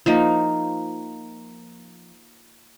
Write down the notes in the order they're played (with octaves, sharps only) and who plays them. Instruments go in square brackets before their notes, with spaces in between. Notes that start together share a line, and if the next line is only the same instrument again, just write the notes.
[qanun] F3 A#3 D#4